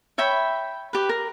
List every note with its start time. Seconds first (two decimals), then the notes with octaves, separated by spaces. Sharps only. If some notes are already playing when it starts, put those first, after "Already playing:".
0.18 C#5 E5 G5 B5
0.93 G4 B4
1.09 A#4